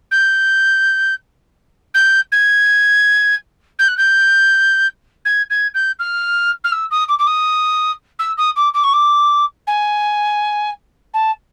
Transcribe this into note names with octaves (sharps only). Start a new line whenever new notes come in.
G6
G6
G#6
G6
F#6
G6
G#6
G#6
G6
F6
F6
E6
D#6
D6
D6
D#6
E6
D#6
D6
D6
C#6
D6
G#5
A5